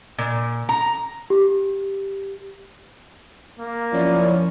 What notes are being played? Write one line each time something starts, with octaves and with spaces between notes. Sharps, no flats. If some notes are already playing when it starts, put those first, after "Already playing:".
A#2
A#5
G4
A#3
F#2 F3 C#4 E4 D5